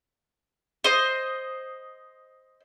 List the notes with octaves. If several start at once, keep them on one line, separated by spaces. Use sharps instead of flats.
C5 D#5